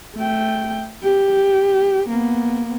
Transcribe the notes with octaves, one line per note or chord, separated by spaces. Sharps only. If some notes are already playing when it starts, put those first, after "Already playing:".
A3 G5
G4
A#3 B3